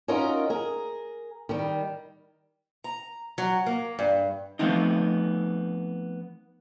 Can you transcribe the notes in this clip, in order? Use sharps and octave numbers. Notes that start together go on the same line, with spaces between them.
C#4 D#4 F4 F#4 A#4 D#5
G#4 A#4
D#3 G3
A#5
F#3
A#3
G2
F3 A3 B3 C4 D#4